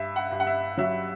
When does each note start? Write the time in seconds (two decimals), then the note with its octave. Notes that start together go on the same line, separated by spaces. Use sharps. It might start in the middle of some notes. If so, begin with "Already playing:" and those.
Already playing: G2 E5
0.16 F#5
0.31 G2
0.40 F#5
0.47 E5
0.77 F#3 E5